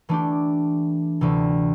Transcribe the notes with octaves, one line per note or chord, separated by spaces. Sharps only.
E3 A3 D4 G4
D2 C3 E3